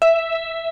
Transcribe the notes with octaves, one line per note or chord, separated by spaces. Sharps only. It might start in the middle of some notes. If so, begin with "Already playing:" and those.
E5